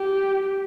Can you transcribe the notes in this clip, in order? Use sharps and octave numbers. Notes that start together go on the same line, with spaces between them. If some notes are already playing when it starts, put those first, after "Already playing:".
Already playing: G4